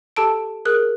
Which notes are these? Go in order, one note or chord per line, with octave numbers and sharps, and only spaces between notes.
G4 A4 A5 D7
G#4 A#4 F#6